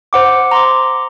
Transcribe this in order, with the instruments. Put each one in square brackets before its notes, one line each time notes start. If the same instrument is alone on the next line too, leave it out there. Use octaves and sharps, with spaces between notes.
[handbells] C5 F#5 D6
A#5 C6 D6